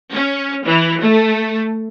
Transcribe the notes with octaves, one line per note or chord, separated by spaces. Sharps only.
C#4
E3
A3